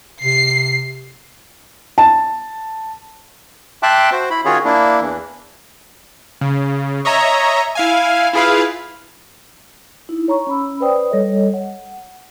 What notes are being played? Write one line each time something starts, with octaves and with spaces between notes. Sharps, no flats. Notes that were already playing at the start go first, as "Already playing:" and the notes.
C3 C7
A5
E5 G5 A5 C6 D6 F#6
F#4 C5
E4 B5
D#3 C#4 F4 F#4 G#4 C#5
A#3 D4 E4
E2 E3
C#3
C#5 D#5 E5 A#5
E4 F5 G#5
E4 F4 G#4 B4 F5
D#4 E4
C#5 A#5 C#6
C#4 B5 E6
B4 C5 D5 G5 D#6
G3 A4 C#5 D#5
F#5